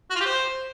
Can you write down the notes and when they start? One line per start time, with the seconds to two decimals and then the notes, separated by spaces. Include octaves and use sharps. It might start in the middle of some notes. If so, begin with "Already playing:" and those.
0.10 F#4
0.15 F4
0.21 G4
0.26 C5